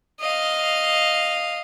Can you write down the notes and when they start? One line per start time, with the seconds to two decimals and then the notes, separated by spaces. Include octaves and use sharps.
0.20 D#5 F5